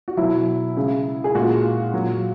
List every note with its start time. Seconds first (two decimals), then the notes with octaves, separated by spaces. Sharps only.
0.08 F#4
0.17 B2 F#3 E4
0.77 C#3 G#3
1.24 G#4
1.35 A#2 G#3 F#4
1.94 A#2 F#3